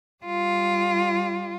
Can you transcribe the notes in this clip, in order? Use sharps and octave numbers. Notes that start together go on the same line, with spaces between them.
G3 F4